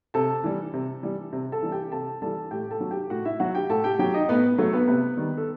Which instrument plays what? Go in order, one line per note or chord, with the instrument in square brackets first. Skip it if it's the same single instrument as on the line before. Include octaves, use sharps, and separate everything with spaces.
[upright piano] C3 A4 A5
E3 G3
C3
E3 G3
C3
A4 A5
E3 G3
G4 G5
C3 A4 A5
E3 G3 A4 A5
A2 G4 G5
A4 A5
F#3
G4 G5
A2 F#4 F#5
E4 E5
F#3 F#4 F#5
G4 G5
A2 A4 A5
G4 G5
F#3 G4 G5
D#4 D#5
A2 B3 B4
F#3 A3 A4
B3 B4
C3 B3 B4
D#3 G3
A4